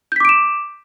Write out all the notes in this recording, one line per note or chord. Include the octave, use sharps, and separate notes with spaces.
D6 G6 B6 D7 E7